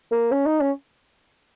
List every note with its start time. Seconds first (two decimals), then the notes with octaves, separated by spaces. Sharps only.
0.12 A#3
0.31 C#4
0.46 D#4
0.60 C#4